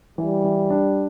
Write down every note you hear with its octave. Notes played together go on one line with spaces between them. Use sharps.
E3 G3
E3
D4